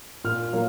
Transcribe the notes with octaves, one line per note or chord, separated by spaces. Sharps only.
A#2 F6
F#3 A#3